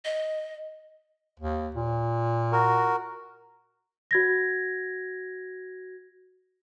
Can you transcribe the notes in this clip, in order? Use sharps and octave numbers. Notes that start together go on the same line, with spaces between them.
D#5
D#2
A#2
F#4 A#4
F#4 G#6 A#6